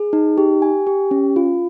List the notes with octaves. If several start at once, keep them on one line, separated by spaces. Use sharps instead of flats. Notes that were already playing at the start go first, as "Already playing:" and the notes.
Already playing: G#4
D#4
G4
G#5
G4
C#4
F4